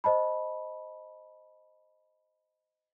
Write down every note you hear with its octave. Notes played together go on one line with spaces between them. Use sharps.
C5 D#5 A5 B5